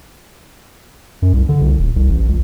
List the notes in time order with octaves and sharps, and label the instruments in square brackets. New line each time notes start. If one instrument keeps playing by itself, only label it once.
[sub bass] F#2
C2
D3
C2
D#1
C2
A1
C#2